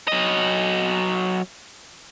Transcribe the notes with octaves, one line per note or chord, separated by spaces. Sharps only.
F#3 D#5